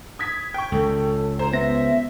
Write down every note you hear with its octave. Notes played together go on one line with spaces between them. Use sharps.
D#6 G#6 B6
G5 C#6
C#2 A4
C5 A#5
B3 E5 A#6